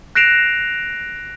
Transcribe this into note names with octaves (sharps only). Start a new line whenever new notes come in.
F#6 A#6 C7 D7 E7 F7